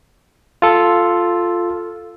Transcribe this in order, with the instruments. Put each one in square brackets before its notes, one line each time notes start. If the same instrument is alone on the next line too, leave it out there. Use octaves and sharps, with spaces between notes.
[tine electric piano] F4 A4